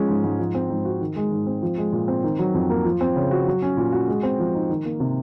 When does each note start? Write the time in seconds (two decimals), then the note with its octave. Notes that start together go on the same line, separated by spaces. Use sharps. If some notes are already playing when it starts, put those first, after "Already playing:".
Already playing: F3 G#3 C#4
0.08 G#2
0.24 G#2
0.39 F3
0.55 C4
0.70 G#2
0.85 F#4
1.01 D#3
1.16 G#3
1.31 G#2
1.47 C4
1.62 F3
1.78 G#3
1.93 A#2
2.08 C4
2.24 D#3
2.39 F#3
2.54 F2
2.70 A#3
2.85 F3
3.01 C4
3.16 C#3
3.31 F#4
3.47 F#3
3.62 C#4
3.77 A#2
3.92 F#4
4.08 G#3
4.23 C4
4.39 F3
4.54 D#4
4.69 D#3
4.85 A#3
5.00 C3